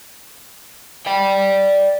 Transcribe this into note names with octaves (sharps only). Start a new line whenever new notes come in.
D5 G5